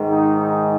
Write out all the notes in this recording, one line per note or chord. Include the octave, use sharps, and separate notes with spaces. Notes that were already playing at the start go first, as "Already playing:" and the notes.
Already playing: G#2 D#3 G#3
D#4
D#4